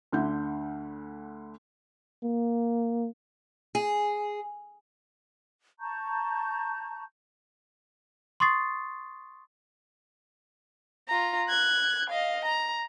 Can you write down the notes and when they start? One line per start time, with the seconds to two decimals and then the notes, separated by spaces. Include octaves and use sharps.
0.12 D2 D3 G6
2.23 A#3
3.75 G#4
5.80 A5 A#5 C#6 G6
8.40 C6 C#6 D#6 A6 C7
11.08 F4 A#5
11.49 F#6 G#6
12.10 D#5 F5
12.45 A#5